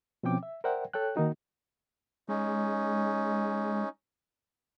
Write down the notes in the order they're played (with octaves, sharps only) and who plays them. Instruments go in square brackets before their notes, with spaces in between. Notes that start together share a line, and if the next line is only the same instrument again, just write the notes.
[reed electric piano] B2 F3 C4 C#4 G5 D6
E5
A#4 C5 D5 E5 F#5 G5
A4 C#5 G5 F#6
D#3 A#3 D#4 F#4
[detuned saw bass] G#3 [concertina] C#4 D#4